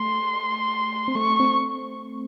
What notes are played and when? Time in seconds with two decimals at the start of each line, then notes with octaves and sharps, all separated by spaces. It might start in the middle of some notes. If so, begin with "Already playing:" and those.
Already playing: A3 C6
1.08 C4
1.15 A3 C#6
1.40 C4